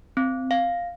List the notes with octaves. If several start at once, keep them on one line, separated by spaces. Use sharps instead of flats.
C4
F5